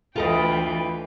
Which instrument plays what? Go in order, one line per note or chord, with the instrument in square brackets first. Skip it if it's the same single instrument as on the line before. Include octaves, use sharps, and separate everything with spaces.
[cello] D2 E3 [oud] F4 A4 D#5 [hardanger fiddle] B4 G5